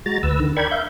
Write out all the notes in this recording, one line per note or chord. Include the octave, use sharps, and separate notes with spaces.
G#3 F#4 A#5 A6
D2 B4 E6
D3 D#3
A#4 D5 G5 B5 C#6 G#6
E5 F5 G6